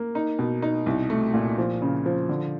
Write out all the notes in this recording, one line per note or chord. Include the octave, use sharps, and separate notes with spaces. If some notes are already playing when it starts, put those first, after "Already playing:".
Already playing: A#3
D#4
B2
D#4
C2
A3
A#2
F3
C#3
F3
D3